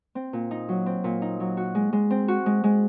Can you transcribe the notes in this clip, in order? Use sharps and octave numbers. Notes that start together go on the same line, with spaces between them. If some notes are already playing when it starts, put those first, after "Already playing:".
C4
A#2
D#4
F#3
C4
A#2
D#4
F#3
F#4
G#3
G#3
C4
F#4
G#3
G#3